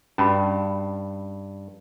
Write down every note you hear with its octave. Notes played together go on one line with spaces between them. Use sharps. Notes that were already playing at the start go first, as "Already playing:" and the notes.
G2 C#4 F#4 A5 B5